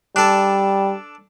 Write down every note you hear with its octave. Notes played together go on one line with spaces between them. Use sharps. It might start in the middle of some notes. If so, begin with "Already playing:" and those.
G3 D4 A4